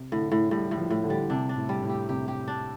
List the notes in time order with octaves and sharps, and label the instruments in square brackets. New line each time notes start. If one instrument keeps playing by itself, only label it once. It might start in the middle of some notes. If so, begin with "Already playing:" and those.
Already playing: [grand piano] C3
[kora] A2 [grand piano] D3
[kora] A2
[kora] A2 [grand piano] G3
[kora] A2
[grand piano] F3
[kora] A2
[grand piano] D3
[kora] G3
[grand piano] C3 [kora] D4
[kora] D4
[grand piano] A2
[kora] G3
[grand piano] A2
[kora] G4
[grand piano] C3 [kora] G4
[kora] G4
D4